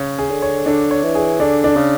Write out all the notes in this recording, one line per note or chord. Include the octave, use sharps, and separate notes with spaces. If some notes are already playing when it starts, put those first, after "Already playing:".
Already playing: C#3 C#5
G#4
D3
C#5
D3 D4
C#5
E3
G#4
D3 D4
D4
C#3